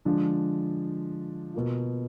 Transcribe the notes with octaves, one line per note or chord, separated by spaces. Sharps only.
D3 F3 G#3 D4
B2 A#3 F4